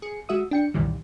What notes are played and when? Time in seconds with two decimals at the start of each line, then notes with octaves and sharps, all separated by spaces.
0.02 G#4 C#7
0.29 G#3 F#4 E5 D#6
0.51 D4 G5 C#7
0.74 C2 F#2 A#2 D#3 E3 G3